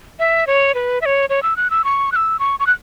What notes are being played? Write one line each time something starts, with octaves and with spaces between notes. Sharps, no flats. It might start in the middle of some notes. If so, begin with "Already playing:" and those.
E5
C#5
B4
E5
C#5
C#5
E6
F#6
E6
C#6
F#6
E6
C#6
C#6
F#6